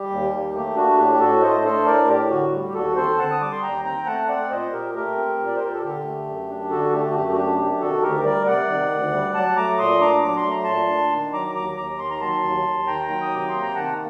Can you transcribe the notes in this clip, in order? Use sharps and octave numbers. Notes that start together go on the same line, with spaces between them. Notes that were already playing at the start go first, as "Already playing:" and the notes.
Already playing: G3 G4
D#2
A#3
A3 G4
D4 F#4
A2 G4
G4
A2 F#4 A4
A3 C5 D#5
D4 A4 C5
A2 A#4 D5
A2 G4
D3 F#4
G3
G4
D#2 F#4 A4
C4 A4 C5
D3 F#5 A5
D#6
G3 D6
C6
D#2 G5 A#5
C4 G5 A#5
A3 F#5 A5
C4 D5 F#5
A#2 C5 D#5
A#2 G4 A#4
A3 G4 A#4
C4
A#2
D5
C5
A#2 A#4
A4
D3 G4
A3
F#2
D4
D3 F#4 A4
A3 G4
F#4
F#2 G4
F#4
D4 G4
C3 G4
D#3 F#4 A4
D2 G4 A#4
G3 A#4 D5
C3 D5 F#5
D#3
D2
G3
F#3 F#5 A5
A3 A#5 D6
A#2 C6 D#6
D4 A#5 D6
F#3 D6
C6
A3 A#5
A#2 A5 C6
D4
D#3
F#3 A#5 D6
D#2 A#5 D6
D#2 A#5 D6
D#3 C6
A#5
F#3 A5 C6
D#2
D#2
D#3 G5 A#5
F#3
D#6
C3 D6
A#3 C6
A#5
D#3 F#5 A5